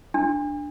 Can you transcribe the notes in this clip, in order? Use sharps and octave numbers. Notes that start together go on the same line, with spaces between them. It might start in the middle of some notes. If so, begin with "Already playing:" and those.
D4